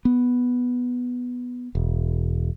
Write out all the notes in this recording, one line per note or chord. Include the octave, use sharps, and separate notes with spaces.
B3
E1